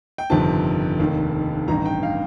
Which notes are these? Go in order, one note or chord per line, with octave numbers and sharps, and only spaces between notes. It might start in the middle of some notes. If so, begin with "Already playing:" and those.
G5
G1 F2 C3 D#3 A5
F1 D#2 D#3
A1 G2 D#3 A#5
G5
F5